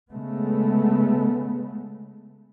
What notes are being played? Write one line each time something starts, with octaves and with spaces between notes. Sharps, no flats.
C#3 G#3 A3 B3